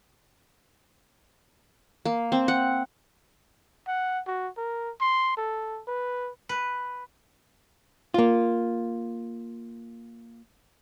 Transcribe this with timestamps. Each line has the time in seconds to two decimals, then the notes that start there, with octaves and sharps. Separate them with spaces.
2.05 A#3
2.32 C4
2.48 F#5
3.88 F#5
4.27 F#4
4.57 A#4
5.01 C6
5.37 A4
5.87 B4
6.49 B4
8.14 A#3 F4